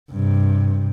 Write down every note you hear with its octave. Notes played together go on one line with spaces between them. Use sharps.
G2 C3